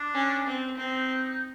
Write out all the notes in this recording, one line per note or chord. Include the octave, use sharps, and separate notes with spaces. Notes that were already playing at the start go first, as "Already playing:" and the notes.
Already playing: D4
C#4
C4
C4 D#4